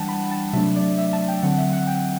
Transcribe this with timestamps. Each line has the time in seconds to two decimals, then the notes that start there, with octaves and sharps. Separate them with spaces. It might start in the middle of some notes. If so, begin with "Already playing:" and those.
Already playing: E3 G3 D4 F#5 G5 A5
0.08 B5
0.31 A5
0.53 C3 F#3 A3 D4 E5
0.76 D5
0.98 E5
1.13 A5
1.28 G5
1.43 D3 F#3 C4 F#5
1.58 E5
1.73 F#5
1.87 G5